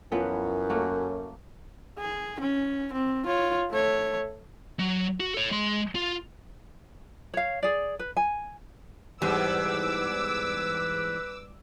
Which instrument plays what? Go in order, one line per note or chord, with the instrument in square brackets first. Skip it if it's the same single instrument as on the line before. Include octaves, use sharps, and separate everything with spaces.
[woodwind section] F#2 [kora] E3 F3 B3
[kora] A3 A#3 F#4
[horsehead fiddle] G#4
C#4
C4
F4 C#5
A3 C#5
[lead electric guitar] F#3
F#4
A4 C#5
G#3 C6
F4
[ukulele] C#5 F5
G#4 D5
B4
G#5
[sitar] E2 G#2 [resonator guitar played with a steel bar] G3 [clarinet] B4 [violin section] D6 E6